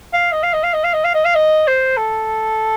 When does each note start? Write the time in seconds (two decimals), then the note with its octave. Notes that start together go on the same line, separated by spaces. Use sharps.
0.14 F5
0.32 D#5
0.43 F5
0.53 D#5
0.64 F5
0.74 D#5
0.84 F5
0.94 D#5
1.04 F5
1.15 D#5
1.25 F5
1.35 D#5
1.68 C5
1.97 A4